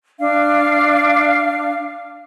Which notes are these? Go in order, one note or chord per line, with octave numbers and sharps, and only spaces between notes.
D4 F5